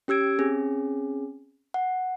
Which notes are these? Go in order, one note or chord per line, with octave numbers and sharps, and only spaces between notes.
C#4 G4 E6 G#6 D7
C4 C#4 G#4
F#5